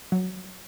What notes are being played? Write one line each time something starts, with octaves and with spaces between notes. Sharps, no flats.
F#3